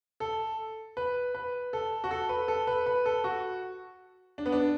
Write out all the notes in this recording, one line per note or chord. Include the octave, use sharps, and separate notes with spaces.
A4
B4
B4
A4
F#4
A4
B4
A4
B4
B4
A4
F#4
D4
B3
D4